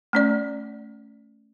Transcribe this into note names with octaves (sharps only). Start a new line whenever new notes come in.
A3 C#4 D5